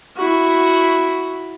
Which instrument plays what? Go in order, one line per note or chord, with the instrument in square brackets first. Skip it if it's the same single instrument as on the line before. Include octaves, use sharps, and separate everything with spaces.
[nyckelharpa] E4 F#4